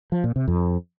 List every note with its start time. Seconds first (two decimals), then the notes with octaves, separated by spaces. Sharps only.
0.12 F3
0.24 A#2
0.36 C3
0.48 F2